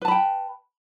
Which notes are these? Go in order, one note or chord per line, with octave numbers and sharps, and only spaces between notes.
B4 G5 A5 B5